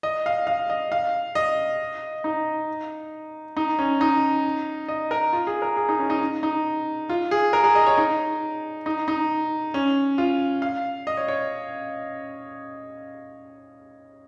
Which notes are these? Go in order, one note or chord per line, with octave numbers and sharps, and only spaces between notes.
D#5
F5
F5
D#5
F5
D#5
D#4
D#4
C#4
D#4
D#5
A#4
F4
G#4
A#4
G#4
D#4
C#4
D#4
D#4
F4
G#4
A#4
G#4
D#5
C#5
D#4
D#4
D#4
C#4
F4
F5
D#5
C#5
C#5